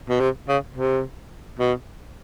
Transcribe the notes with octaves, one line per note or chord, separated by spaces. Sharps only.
B2
C3
C#3
C3
B2